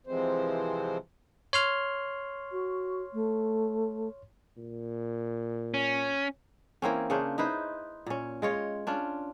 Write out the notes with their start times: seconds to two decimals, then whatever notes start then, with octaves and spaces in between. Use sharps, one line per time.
0.07 C3 E3 F3 G#3 C4 C5
1.53 C#5 C6 F6
2.52 F#4
3.13 A3
4.57 A#2
5.74 C#4
6.82 E3 A#3 C4 C#4
7.10 C#3 C#4 D4 C5
7.38 D#4 E4 B4 C5
8.06 A#2 C#4
8.42 G#3 F4 C#5
8.87 C#4 D4 F4